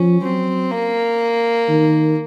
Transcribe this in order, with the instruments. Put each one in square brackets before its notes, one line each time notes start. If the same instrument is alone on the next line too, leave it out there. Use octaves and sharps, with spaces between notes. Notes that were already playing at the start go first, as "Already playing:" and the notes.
Already playing: [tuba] F3 [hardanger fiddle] C#4
[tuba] F#3 [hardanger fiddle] C4
[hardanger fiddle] A#3
[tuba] D#3